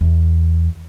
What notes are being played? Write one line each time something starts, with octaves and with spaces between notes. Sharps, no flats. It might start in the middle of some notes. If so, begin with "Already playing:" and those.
E2